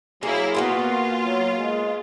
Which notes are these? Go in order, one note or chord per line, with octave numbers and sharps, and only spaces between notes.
F#3 A#3 E4 G#4
A#2 A#3 B3 F4 F#4
F#3
G#3